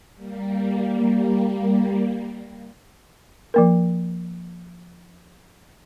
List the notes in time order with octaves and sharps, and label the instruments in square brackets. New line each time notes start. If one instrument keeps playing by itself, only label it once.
[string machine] G3 A#3
[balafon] F3 A#3 A#4